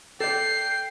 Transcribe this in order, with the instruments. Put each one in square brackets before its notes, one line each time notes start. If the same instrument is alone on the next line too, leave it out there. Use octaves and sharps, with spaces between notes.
[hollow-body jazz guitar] A4 D5 [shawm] G5 [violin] C7